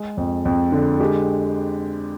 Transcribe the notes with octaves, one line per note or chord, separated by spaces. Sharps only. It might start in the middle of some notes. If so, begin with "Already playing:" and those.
Already playing: G#3 G#4
F2
F2
D3
G#3 G4